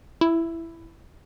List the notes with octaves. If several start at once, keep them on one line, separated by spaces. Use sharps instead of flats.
E4